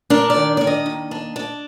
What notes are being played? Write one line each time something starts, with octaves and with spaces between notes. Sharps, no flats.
D4 A#4
D5
D#3
D#3 D5
D#5
D#2
D4
D4